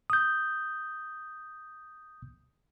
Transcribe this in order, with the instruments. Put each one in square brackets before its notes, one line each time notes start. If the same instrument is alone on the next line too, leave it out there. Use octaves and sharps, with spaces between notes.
[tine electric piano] D#6 G6